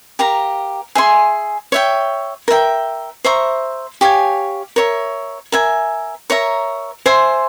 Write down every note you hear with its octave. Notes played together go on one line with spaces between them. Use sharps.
G4 A#4 F5 A#5
G#4 E5 G#5 C6
C#5 E5 G5
A#4 E5 G5
C5 E5 A#5 C#6
G4 C#5 F5 G#5
A#4 C#5 E5
A#4 E5 G#5
A#4 C#5 E5 A#5
C5 E5 G#5 C6